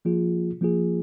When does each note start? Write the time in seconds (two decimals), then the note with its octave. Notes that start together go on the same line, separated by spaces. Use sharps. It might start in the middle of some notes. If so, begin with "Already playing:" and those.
0.05 F3 A#3 F4 G#4
0.61 F3 A#3 F4 G#4